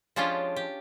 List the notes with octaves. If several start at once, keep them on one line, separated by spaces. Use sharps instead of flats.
F3 G#3 C#4 D4 F4 G4
G4